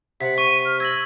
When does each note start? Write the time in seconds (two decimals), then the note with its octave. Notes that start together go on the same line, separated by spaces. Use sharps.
0.21 C3 F#5 B6
0.38 C#6 D#7
0.65 F6
0.80 E6 G#6 A#6 F#7